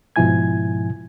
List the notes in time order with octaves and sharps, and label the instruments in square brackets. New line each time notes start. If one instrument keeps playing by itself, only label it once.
[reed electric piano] G#2 B2 F3 E4 G#5 G#6